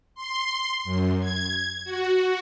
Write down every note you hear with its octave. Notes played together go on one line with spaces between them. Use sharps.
C6
F#2
G#6
F#4